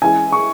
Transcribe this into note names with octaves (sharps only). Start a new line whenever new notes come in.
E3 G#3 C#4 E4 G#4 G#5
C#6